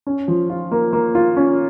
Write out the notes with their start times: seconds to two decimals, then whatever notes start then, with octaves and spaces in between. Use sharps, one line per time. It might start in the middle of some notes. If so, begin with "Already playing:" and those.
0.07 C#4
0.28 F3
0.50 F4
0.72 A#3
0.93 A#3
1.15 F4
1.37 C#4